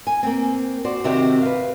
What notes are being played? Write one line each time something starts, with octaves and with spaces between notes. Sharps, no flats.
G#5
A#3 C4
F#4 C5 D5
C3 D#3 C4 F#4 G4 G5
B4 F5